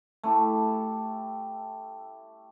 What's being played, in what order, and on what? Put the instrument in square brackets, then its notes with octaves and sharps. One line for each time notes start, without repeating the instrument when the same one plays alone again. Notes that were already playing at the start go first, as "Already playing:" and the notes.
[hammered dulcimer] A3 E4 G4 A4